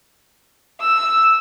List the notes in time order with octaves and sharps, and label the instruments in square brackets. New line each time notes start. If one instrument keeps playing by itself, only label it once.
[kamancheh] E6